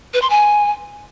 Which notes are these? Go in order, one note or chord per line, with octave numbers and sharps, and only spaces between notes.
B4
C6
G#5